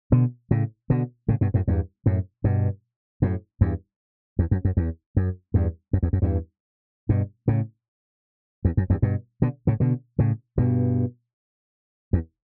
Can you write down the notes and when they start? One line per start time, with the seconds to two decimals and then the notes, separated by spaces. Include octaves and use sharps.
0.12 B2 D3
0.51 A2 C#3
0.90 B2 D3
1.28 A2 C#3
1.41 G2 B2
1.54 F#2 A2
1.68 E2 G2
2.06 F#2 A2
2.44 G2 B2
3.22 F#2 A2
3.61 E2 G2
4.39 E2
4.51 F#2
4.65 F#2
4.77 E2
5.17 F#2
5.54 E2 G2
5.93 F#2
6.03 E2
6.13 F#2
6.22 E2 G2
7.09 G2 B2
7.48 A2 C#3
8.65 E2
8.77 F#2
8.90 E2 G2
9.02 G2 B2
9.42 B2 D3
9.67 A2 C#3
9.80 B2 D3
10.19 A2 C#3
10.58 G2 B2
12.13 E2